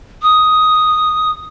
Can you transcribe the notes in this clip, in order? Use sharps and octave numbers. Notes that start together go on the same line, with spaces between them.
D#6